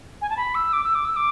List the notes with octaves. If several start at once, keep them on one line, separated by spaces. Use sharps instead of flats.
G#5
A5
B5
E6
D6
E6
D6
E6
D6